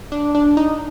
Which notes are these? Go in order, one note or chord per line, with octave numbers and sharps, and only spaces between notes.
D4
D4
D#4